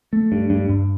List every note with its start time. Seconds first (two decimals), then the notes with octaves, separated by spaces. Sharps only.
0.13 A3
0.32 G2
0.50 G2
0.69 G2